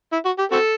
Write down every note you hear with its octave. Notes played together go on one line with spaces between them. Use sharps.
E4
F#4
G4
C4 F#4 A4